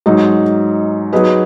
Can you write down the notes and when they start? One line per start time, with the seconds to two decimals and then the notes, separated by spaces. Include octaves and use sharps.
0.06 G#2 F#3 D#4
1.13 F#3 D#4 G#4 B4